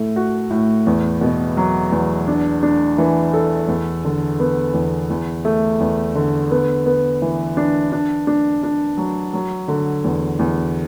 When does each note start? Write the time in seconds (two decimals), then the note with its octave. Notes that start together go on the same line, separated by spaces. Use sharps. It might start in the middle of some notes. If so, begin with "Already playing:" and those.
Already playing: A2 A3
0.16 F#4
0.50 A2
0.87 E2
1.21 B2
1.57 F#3
1.92 E2
2.28 D4
2.63 D4
2.98 E3
3.33 A4
3.68 E2
4.05 D3
4.40 B3
4.74 E2
5.10 E2
5.45 A3
5.80 E2
6.15 D3
6.51 B3
6.86 B3
7.22 E3
7.57 D4
7.92 D4
8.27 D4
8.63 D4
8.97 F#3
9.33 F#3
9.68 D3
10.04 E2
10.39 E2